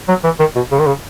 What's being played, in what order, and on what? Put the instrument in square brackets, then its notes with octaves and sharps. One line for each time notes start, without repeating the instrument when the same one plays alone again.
[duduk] F#3
E3
D#3
B2
C#3
D#3
C#3